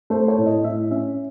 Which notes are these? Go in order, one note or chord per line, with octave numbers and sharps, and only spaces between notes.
A3 C5
C#5
A2
D#5
A2 E5
C#4 E5